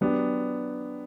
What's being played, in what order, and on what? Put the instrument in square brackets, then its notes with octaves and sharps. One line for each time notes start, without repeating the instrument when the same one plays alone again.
[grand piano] F#3 B3 D4 G4